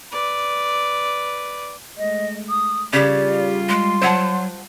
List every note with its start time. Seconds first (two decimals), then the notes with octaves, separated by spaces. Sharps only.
0.12 B4 D5
1.98 G#3 A3 D#5
2.49 D#6
2.93 C#3 G3 F4 G4 D5
3.69 G#3 C6
4.01 F#3 C5 F#5 A5